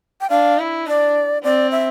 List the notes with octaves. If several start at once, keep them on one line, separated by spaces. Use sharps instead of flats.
G5
D4 F5
E4
D4 D5
C4 D5
E5